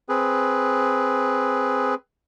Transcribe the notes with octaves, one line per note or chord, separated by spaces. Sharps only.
C4 G#4 B4